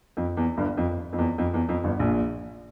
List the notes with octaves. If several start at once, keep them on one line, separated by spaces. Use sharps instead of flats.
F2
E2
G1 G2
F2
F2
E2
F2
E2
F2
G1 G2
A#1 A#2